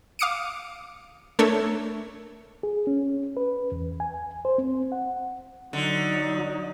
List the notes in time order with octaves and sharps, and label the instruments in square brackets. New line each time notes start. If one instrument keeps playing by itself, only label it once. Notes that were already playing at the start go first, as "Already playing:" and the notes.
[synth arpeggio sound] F5 D6 D#6 C#7 D7
A3 D4 A4 A#4 C#5
[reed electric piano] G#4
C#4
B4
E2
G#5
C5
C4
F#5
[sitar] D3 [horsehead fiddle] F#3 D#4